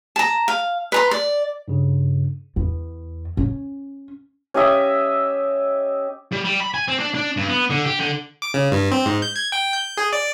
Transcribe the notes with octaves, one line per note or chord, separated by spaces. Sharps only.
A5 A#5
F5
B4 A#5 C6
D5
G2 C#3
E2
C#4
C#4 G4 D#5 E5
G3
G3
B5
G#5
C4
D4
D4
G2
B3
D3
G4
D3
D6
C#3
G2
C4
G#2
G6
G#6
G5
G6
G#4
D5